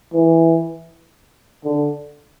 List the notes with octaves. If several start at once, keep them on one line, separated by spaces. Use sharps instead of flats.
E3
D3